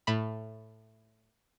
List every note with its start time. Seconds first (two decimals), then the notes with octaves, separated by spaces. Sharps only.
0.07 A2 B5